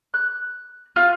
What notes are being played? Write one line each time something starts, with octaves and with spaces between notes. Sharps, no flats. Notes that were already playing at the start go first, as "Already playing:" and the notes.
F#6
F4